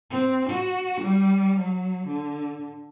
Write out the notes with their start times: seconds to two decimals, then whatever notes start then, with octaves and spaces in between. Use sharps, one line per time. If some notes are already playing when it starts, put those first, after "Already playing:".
0.10 C4
0.50 F#4
1.01 G3
1.59 F#3
2.07 D3